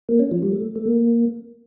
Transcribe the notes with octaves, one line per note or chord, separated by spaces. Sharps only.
A#3
C#4
F3
G3
A3
A3
A#3